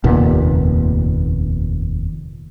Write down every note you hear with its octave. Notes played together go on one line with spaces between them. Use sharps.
F1 D#2 A#2 B3